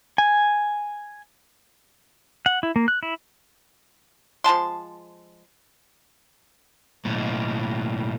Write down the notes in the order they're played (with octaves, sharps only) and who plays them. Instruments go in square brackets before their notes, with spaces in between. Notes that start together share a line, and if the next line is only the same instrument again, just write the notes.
[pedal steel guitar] G#5
F#5
E4
A#3
F#6
E4
[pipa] F3 G#3 A5 C6
[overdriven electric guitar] B1 A2